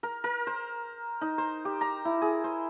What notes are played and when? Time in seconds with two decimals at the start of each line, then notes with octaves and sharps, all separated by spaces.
0.03 A#4
0.24 A#4
0.47 C5
1.21 D#4
1.38 C5
1.65 G4
1.81 A#5
2.05 E4
2.22 G#4
2.44 C5